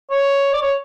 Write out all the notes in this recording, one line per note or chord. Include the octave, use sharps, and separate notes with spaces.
C#5
D5
C#5